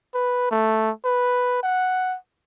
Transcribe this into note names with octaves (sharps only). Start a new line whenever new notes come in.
B4
A3
B4
F#5